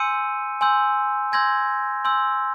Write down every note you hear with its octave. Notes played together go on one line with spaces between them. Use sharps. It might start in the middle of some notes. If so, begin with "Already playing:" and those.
Already playing: G#5 C6 E6 G6 C#7 D#7
G#5 C6 E6 G6
G#5 C6 E6 G6 G#6 A#6
G#5 C6 E6 G6